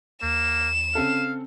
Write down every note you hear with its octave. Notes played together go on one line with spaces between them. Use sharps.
D#2 A#3 E7
C#3 C4 A4 F5